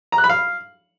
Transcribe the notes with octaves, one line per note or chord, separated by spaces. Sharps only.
A#5
F#6
B5
F5